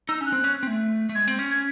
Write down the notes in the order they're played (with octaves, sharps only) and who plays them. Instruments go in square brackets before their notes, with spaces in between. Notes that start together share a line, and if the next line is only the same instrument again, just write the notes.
[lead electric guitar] D#4 [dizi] E6
[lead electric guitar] C#4 [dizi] E6
[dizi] F#6
[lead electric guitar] C4
C#4
C4
A3
A3
[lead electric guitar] G#3 [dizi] G#6
[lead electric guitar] C4
C#4
[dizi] G#6